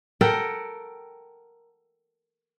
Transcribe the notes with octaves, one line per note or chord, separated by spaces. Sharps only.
A4 A#4 F#5 G5